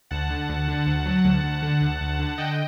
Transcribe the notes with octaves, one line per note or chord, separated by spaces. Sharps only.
D2 F#5 A5
D3
D2
D3
D2
F#3
D2
D2
D3
D2
D2
D3
D3 D#5 G5